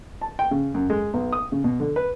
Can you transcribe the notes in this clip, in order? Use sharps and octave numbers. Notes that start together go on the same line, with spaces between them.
A5
G5
C#3
F#2
G#3
B1
D#6
C#3
B2
D3
B4